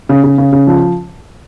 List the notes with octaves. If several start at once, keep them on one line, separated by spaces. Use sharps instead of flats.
C#3
C#3
C#3
C#3
F3